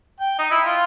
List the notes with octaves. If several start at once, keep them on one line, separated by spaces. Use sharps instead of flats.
G5
D#4
E4
F4